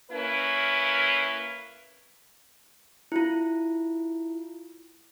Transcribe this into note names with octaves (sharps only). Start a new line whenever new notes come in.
A#3 C#4 E4 B4
E4 F4